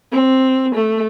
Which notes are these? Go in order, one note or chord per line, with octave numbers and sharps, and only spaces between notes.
C4
A3